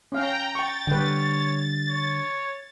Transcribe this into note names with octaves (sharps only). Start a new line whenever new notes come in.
C#4 F5 G5 A#5
G5 C#6 A6
D3 G3 B4 C#5 G5
C#5